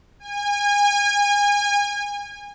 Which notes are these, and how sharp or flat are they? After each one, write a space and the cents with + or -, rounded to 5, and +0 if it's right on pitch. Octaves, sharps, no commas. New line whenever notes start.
G#5 -30